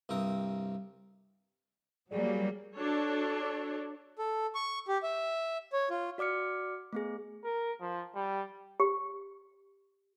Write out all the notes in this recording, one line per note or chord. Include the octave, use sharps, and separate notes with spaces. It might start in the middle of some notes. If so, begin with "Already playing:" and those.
C2 G2 C4 A#4 D#6
F#3 G3 A#3 G#4 D5
D4 F#4 A4 C#5
A4
C#6
G4
E5
C#5
F4
F#4 D5 D6 F6 C#7
A3 B3 G#4
A#4
F3
G3
G4